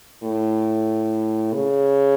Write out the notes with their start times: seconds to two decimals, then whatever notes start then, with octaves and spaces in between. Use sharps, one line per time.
0.23 A2
1.54 C#3